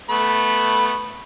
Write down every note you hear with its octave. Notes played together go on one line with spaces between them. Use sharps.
A3 B3 B5